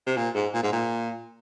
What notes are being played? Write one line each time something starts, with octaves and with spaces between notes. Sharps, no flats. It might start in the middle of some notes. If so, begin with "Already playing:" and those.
C3
A#2
G#2
A#2
G#2
A#2